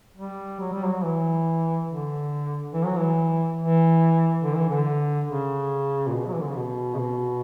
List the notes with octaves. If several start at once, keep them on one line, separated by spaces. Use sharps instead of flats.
G3
F#3
G3
F#3
E3
D3
E3
F#3
E3
E3
D3
E3
D3
C#3
A#2
B2
F#3
E3
D3
C#3
B2
C#3
B2